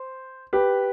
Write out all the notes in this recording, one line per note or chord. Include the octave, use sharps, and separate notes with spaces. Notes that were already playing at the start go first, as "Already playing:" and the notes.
Already playing: C5
G4 B4